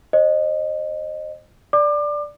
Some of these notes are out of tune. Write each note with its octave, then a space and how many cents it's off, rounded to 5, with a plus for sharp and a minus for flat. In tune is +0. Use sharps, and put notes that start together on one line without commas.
C5 +30 D#5 -20
D5 +0 D6 +30